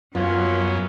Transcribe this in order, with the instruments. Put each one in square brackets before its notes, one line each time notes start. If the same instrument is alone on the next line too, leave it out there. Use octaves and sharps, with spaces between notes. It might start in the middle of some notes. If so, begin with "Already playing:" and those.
[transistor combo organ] F#2 [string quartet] F#3 [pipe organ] A#3 B3 C#4 [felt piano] F4